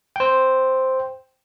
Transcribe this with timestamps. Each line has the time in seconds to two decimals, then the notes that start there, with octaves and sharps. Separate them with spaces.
0.16 C5 G5